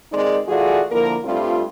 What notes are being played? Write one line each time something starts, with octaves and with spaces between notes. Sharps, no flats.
D#3 G#3 C4 D#4 G#4 D5
E3 A3 F4 F#4 G#4 D5
D3 F3 A#3 E4 A#4
G2 G3 A3 C4 F4